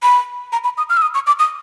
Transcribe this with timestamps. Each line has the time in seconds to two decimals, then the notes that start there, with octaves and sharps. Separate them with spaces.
0.02 B5
0.52 A#5
0.64 B5
0.77 D#6
0.90 F6
0.97 E6
1.02 D#6
1.14 C#6
1.27 D6
1.39 D#6